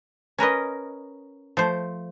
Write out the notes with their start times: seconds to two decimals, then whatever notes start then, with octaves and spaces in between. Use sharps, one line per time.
0.38 C#4 A#4 B4 D#5
1.57 F3 A3 C5